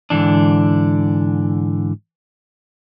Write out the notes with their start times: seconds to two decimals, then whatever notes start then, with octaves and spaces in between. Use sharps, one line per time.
0.10 G#2 D3 E3 D4